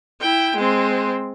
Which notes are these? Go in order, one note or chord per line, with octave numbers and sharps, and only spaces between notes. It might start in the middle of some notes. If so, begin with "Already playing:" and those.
E4 G5
G#3 C4